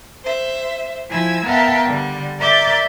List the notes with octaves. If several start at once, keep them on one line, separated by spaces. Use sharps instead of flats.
C5 E5
F3 E4 G#5 E6 G#6
B3 A#4 E5 F5 G5 A5
D3 G3
A#4 D5 E5 D6 G6 A6